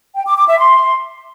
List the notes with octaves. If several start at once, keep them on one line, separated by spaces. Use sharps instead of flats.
G5
D6
D6
E5
C6